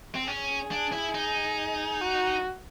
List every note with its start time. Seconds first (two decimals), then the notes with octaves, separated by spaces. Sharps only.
0.15 C4
0.27 C#4 G#4
0.71 D4
0.92 E4
1.15 D#4
2.01 F#4